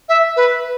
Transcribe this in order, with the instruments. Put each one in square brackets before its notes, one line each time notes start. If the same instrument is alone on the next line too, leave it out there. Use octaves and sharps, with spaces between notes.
[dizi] E5
B4